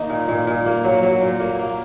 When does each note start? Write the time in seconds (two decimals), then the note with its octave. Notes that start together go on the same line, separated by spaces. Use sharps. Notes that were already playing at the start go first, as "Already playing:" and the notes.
Already playing: D#3 A#3 D#4
0.10 A#2
0.28 A#2
0.47 A#2
0.66 A#3
0.84 F#3
1.03 F#3
1.22 A#2
1.40 A#3
1.59 A#3